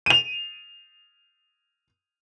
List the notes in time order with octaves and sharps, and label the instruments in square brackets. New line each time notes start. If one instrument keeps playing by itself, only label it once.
[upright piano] D#7 F7